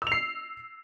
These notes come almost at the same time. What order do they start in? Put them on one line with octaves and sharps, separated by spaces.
E6 F7 C7